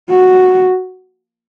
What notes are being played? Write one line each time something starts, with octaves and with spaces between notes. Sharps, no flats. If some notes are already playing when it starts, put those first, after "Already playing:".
F#4